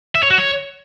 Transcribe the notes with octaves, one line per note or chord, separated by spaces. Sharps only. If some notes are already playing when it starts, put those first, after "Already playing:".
E5
C#5
F#4
C#5